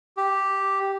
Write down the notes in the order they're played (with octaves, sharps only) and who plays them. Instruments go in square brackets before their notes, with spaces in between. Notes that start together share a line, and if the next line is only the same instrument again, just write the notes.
[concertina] G4